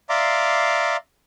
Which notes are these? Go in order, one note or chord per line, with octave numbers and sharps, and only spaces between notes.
D5 E5 F5 A#5 C6 D6